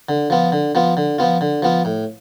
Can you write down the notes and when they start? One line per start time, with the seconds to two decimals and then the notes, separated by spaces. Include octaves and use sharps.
0.09 D3
0.30 F3 B3 F4
0.52 D3
0.75 F3 B3 F4
0.97 D3
1.18 F3 B3 F4
1.41 D3
1.62 F3 B3 F4
1.85 A2